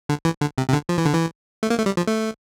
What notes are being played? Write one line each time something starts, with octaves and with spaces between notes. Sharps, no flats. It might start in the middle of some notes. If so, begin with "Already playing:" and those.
D3
E3
D3
C3
C3
D3
F3
E3
D3
E3
A3
A#3
A3
G3
F3
A3